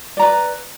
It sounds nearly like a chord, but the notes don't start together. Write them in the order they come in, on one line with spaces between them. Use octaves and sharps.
D5 A#5 B4